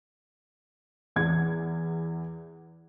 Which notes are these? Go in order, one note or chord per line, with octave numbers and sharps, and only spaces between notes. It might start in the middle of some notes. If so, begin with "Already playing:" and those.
E2 G#6